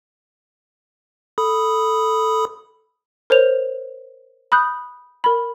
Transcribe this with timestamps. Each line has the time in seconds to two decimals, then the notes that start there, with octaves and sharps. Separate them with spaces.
1.38 A4 B5 D#6
3.30 A#4 C5 C#5 F7
4.52 B5 D#6 F#6 G6
5.24 A#4 B5